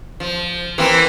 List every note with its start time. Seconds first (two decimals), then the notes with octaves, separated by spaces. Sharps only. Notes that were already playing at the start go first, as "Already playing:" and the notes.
0.20 F3
0.78 E3 A#3 C4